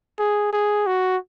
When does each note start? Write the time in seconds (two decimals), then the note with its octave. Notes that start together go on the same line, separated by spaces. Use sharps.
0.19 G#4
0.53 G#4
0.86 F#4